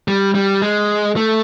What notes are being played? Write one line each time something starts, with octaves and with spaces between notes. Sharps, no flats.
G3
G3
G#3
A3